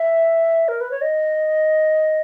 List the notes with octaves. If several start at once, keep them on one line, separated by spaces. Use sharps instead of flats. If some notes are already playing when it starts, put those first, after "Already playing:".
Already playing: E5
A#4
B4
C#5
D#5